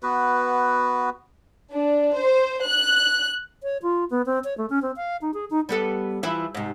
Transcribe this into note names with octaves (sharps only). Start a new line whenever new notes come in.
B3 F#4 B4
D4
C5
F#6
C#5
F4
B3
C4
C#5
A3
C#4
C4
F5
D#4
G#4
D#4
G3 B3 A4
E3 F3 E4
G#2 C3